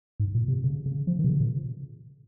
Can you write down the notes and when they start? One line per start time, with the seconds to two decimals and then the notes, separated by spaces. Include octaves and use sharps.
0.20 G#2
0.35 A#2
0.48 C3
0.64 C#3
0.86 C#3
1.07 F3
1.19 D#3
1.24 C3
1.30 C#3
1.40 A#2